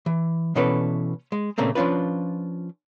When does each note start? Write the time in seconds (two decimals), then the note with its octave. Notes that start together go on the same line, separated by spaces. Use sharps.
0.06 E3
0.56 B2 E3 C#4 A4 B4 D5
1.32 G#3
1.58 A#2 C#3 A3 A#3 C4
1.75 F3 C#4 D4 F4 B4